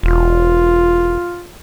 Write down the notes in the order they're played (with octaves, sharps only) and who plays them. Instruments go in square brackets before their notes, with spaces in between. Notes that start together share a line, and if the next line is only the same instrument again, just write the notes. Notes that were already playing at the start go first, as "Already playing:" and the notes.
[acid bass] E1 [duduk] F4